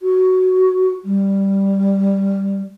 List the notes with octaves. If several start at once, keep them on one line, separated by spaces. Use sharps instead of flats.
F#4
G3